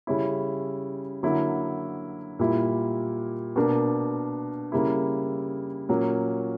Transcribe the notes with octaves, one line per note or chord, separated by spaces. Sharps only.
C#3 G3 C#4 E4
D3 F#3 A#3 E4
A#2 G3 A#3 E4
B2 A#3 D4 A#4
C#3 G3 A#3 E4
A#2 F#3 A#3 C#4